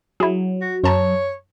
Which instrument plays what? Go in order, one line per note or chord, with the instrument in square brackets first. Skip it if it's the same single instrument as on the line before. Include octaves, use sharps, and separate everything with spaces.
[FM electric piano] F#3 [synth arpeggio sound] E4 G#4
[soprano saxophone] F#4
[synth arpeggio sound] F#2 A5 A#5 [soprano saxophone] C#5